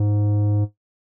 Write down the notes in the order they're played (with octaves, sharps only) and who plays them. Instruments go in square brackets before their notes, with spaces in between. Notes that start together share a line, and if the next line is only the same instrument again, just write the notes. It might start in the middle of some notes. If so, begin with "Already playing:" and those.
Already playing: [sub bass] G#2